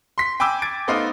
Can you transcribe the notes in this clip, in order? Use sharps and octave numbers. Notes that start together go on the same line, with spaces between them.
C6 B6
G5 G#5 B5 D6 E6 G6
G#6 A6 D7
A3 B3 D#4 C5 D#5 F5